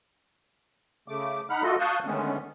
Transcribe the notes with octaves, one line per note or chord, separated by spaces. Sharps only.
C#3 A3 D6
D#4 F#5 B5 F6
A3 F4 F#4 A4 D#5
F5 A5 C#6 D#6 F#6 G6
D3 D#3 G#3 A3 B3 C#4